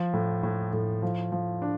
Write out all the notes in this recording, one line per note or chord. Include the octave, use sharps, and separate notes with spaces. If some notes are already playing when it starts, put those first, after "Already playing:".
Already playing: F3
A2
A2
A2
F3
F3
D4